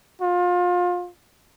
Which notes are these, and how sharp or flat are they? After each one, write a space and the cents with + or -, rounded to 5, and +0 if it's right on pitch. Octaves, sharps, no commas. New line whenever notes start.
F4 +30